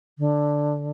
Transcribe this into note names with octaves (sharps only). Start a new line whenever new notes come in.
D3